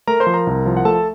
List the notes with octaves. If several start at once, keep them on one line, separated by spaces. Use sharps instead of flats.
A3 A#4 A#5
C5 C6
F3
A#4 A#5
C2
F3
F#5
A3 A4 A5